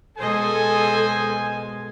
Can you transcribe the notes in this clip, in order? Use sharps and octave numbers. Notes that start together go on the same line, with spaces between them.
B2 G#3 G#4 A4 C5 D#5 G#5